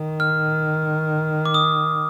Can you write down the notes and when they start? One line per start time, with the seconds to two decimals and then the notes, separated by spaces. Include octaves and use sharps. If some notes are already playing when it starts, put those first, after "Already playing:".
Already playing: D#3
0.20 F6
1.45 D6
1.54 D#6